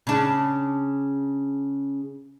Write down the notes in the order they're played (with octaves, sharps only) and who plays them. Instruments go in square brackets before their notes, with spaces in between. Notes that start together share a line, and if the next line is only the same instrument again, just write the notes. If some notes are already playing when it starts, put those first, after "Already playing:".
[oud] C#3 D4